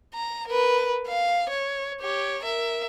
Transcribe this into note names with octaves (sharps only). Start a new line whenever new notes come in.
A#5
A#4 B4
F5
C#5
G4 C#5
A#4 E5